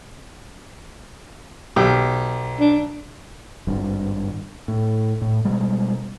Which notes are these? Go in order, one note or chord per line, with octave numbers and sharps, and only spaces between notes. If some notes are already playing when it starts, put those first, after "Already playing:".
B1 G4
D4
G#1 G2
A2
A2
B2 G3 G#3